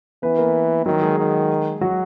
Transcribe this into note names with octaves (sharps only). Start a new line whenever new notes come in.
E3 B3 B4
A#3 A#4
D#3 F#3 F#4
G#3 G#4
D#3
F#3 F#4